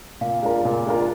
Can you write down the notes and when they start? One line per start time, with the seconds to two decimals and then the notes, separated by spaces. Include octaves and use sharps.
0.21 A#2 F5
0.42 G#3 D4 F4 A#4
0.65 A#2
0.86 G#3 D4 F4 A#4